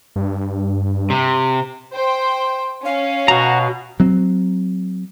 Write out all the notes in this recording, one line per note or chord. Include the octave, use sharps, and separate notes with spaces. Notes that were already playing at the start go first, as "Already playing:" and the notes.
G2
C3
C5 G5
C#4 F5
B2 F#4 A#5
F#3 C4